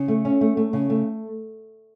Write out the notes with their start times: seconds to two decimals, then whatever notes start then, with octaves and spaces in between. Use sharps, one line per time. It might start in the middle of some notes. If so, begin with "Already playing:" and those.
Already playing: C#3
0.08 A3
0.25 C#4
0.41 A3
0.57 A3
0.73 C#3
0.90 A3